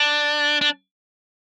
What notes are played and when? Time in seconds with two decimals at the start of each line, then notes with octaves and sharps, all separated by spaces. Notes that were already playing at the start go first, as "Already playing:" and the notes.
Already playing: D4
0.61 D4